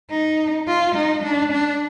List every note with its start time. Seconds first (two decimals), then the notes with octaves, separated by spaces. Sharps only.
0.10 D#4
0.68 F4
0.95 D#4
1.23 D4
1.52 D4